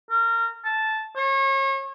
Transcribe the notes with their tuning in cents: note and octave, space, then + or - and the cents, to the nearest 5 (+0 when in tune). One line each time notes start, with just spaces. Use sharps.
A#4 -25
A5 -10
C#5 -35